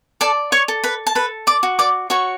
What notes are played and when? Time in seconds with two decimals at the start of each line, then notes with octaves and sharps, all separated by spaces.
0.21 A4 D5 A5
0.52 C#5 C#6
0.68 A4
0.84 B4 B5
1.07 A5
1.15 A4 B4 B5
1.47 D5 D6
1.63 F#4
1.79 D5 D6
2.10 F#4 C#5 C#6